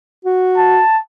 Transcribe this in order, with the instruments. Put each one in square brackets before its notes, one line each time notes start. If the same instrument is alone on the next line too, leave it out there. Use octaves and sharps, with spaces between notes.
[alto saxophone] F#4
[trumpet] A5